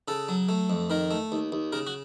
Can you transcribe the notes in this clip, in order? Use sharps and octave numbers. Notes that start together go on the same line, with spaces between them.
C#3 A4
F#3
A3
F2
D#3 A#4
A3
D#2
D#2
C#3 A#4
F#4